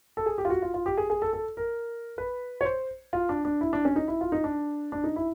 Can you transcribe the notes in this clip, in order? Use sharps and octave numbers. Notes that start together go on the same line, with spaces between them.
A4
G#4
G4
F4
F#4
F4
F4
G4
G#4
G#4
A4
A4
A#4
B4
C#5
C5
F4
D4
D4
E4
D4
C#4
D#4
E4
F4
D#4
D4
D4
D#4
E4